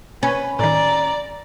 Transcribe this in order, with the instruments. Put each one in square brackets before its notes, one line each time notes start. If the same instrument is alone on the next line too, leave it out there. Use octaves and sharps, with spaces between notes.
[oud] C#4 [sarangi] B4 [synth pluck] G#6
[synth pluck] A2 D#3 [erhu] D5 [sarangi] A#5